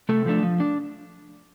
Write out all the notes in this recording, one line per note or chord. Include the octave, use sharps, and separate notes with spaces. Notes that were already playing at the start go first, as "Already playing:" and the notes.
C3 A3 A4
F3 A3 D4
F3
D4